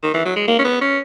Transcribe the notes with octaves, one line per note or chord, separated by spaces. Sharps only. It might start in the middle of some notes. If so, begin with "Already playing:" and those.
D#3
E3
F#3
G#3
A#3
C#4
B3
C#4